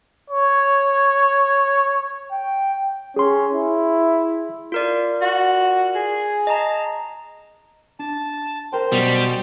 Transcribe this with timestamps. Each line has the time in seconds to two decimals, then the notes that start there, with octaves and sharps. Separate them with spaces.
0.30 C#5
2.32 G5
3.16 C#4 G#4 C6
3.54 E4
4.72 F4 A#4 D5
5.22 F#4
5.95 G#4
6.47 D#5 A5 A#5
7.99 D4 A5
8.73 A#4 C5 G5
8.92 F#2 B2 G3